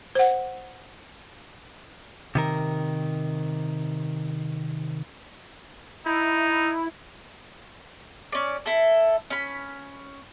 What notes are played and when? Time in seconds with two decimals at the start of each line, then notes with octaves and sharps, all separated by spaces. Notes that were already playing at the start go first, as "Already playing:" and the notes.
0.15 C5 F#5
2.35 C3 D#3 A#4
6.06 D#4 E4
8.32 C#4 D5
8.66 E4 A4
9.30 C#4 B5